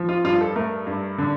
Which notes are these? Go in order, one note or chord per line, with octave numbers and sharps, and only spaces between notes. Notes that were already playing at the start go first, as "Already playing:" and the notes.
Already playing: F3
F4
G2 F4
A4
A3 A#4
G2
D3